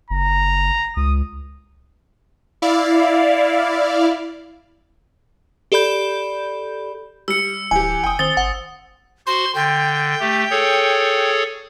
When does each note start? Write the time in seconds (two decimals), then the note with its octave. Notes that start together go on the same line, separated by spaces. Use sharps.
0.10 F#1 A#5
0.97 C#2 D#6
2.62 E4 D5 F5
5.72 G4 A4 D5 B5 G6
7.28 G3 E6 C#7
7.71 D1 E3 G4 G#5
8.04 F1 G5 D#6
8.19 D#3 C4 D#6 A6 G7
8.37 G#1 F#5
9.27 F#4 C5 C6
9.55 D3 G5
10.20 A3 G4
10.51 G#4 A4 C#5